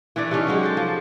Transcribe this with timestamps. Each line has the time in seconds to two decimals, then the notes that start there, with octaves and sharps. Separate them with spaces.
0.16 E3 A3 D4 D5
0.31 C3 A3 C#4 D#4
0.47 F#3 G#3 F#4 G4
0.63 A4 C5
0.77 F3